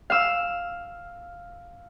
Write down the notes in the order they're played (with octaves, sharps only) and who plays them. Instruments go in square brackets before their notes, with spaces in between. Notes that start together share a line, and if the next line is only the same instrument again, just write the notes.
[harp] F5 E6